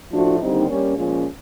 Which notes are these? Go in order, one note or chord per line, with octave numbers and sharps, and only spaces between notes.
A2 F3 A3 D4 F#4
D#2 D3 G3 C4 D#4
G3 A#3 C#4
A#2 F3 G#3 C#4